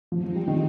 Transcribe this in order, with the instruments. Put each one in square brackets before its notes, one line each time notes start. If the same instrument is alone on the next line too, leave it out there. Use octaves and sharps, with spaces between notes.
[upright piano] F3 [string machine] G#3 C4 D#4
[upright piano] F3
G3
D#3